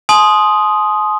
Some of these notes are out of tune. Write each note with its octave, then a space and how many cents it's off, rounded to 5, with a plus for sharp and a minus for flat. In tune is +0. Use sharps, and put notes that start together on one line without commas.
G#5 +45 C6 +0 D#6 +0